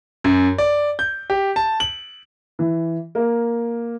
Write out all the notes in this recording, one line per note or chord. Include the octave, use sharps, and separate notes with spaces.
F#2
D5
G6
G4
A5
F#7
E3
A#3